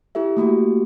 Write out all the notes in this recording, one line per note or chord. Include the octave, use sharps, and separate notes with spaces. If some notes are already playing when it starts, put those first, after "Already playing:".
E4 G4 A4 E5
A3 A#3 F#4 G4